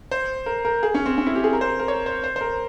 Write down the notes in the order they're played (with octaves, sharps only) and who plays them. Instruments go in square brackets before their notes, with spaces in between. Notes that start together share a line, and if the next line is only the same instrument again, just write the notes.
[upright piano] C5
A#4
A#4
G#4
C#4
C4
C#4
E4
G4
G#4
A#4
C5
A#4
C#5
C5
C5
C5
A#4